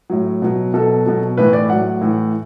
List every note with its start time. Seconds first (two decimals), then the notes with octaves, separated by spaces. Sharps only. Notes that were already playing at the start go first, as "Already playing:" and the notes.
0.10 A2 F#3
0.42 B2 F#3
0.73 B2 F#3 A4
1.06 B2 F#3
1.37 A2 E3 B4
1.53 D5
1.70 A2 F#3 F#5
2.01 A2 E3